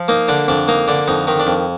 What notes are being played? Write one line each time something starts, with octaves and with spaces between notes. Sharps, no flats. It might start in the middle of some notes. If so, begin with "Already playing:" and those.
Already playing: F3
A#3 D#4
D3 D4
F2 D4
A#3 D#4
D3 D4
F2 D#4
D#3 D#4
D4
F2